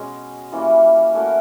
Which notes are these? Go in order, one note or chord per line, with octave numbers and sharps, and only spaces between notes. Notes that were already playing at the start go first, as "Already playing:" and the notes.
Already playing: B2 G#3 C#4
E3 G3 A#3 C#4
A3 C#4 F#4 A#4